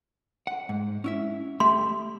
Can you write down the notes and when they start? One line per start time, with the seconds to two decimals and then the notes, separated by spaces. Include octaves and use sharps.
0.47 F#5
0.69 G#2
1.04 C#4 E4 E5
1.60 A3 G4 E5 C6